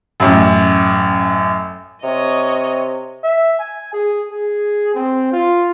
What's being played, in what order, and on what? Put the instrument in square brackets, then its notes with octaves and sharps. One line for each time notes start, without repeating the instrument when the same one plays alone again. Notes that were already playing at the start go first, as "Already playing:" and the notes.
[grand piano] A1 F#2
[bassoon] C3 [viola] C#5 D#5
[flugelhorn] E5
G#5
G#4
G#4
C4
F4